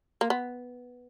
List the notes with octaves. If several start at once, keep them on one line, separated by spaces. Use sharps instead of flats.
A#3
B3